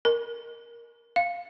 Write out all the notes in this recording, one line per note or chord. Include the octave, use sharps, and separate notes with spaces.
A#4
F5